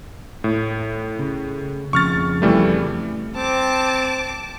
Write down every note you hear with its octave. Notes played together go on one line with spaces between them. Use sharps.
A2
C#3
F2 C#3 C#6 F6 A6
E3 G3 A3
C4 A5 D6